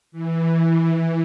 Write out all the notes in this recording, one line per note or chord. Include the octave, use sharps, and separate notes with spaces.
E3